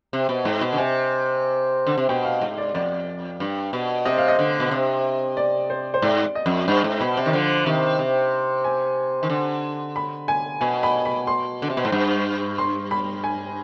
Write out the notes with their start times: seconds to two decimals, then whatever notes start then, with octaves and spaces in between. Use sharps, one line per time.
0.13 C3
0.29 B2
0.45 G#2
0.61 B2
0.72 D3
0.77 C3 G#5
1.87 D3
1.98 C3
2.09 B2 G5
2.25 F5
2.41 G#2
2.58 D5
2.74 F2 D5
3.40 G2
3.73 B2
4.05 C3 D#5
4.18 F5
4.28 D#5
4.39 D3
4.60 B2
4.71 C3
5.37 D5
5.70 C5
5.94 C5
6.02 G#2 D5
6.35 D#5
6.46 F2
6.68 G2 D#5
6.84 G#2
7.01 B2 B5
7.17 C3
7.26 D#3
7.33 D3 F3
7.66 C3 D#3
7.99 C3
8.64 G#5
9.23 D#3
9.30 D3
9.96 B5
10.28 G#5
10.61 B2 G#5
10.83 B5
11.05 B5
11.27 C6
11.62 D3
11.70 C3
11.77 B2
11.85 G#2
11.92 G2
12.58 C6
12.91 B5
13.24 G#5